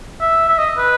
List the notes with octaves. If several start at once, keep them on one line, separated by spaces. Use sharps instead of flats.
E5
E5
D#5
B4